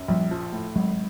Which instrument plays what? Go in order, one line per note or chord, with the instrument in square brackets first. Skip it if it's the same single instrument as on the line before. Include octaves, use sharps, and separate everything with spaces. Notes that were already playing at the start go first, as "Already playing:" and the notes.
Already playing: [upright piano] F#2
[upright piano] A#1 [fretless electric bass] F3 G3
[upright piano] F3
A2
[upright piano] G#1 [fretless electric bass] F#3 G#3